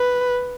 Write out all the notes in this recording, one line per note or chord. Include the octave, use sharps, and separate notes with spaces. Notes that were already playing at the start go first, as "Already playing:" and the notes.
Already playing: B4